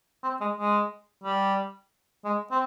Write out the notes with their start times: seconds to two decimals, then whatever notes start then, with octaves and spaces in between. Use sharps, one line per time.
0.24 C4
0.41 G#3
0.58 G#3
1.24 G3
2.25 G#3
2.51 C4